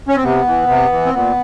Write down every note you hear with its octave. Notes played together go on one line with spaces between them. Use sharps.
C#4
C4
C3 B3
E3
C3
E3
C4
A#2 B3